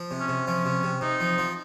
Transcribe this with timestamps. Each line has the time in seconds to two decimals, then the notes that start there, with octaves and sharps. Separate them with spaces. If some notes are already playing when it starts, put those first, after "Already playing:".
Already playing: F3
0.11 C3
0.20 C#4
0.28 C3
0.47 F3 C#4
0.65 C3
0.83 C3
1.01 C3 D#4
1.20 F3
1.38 F3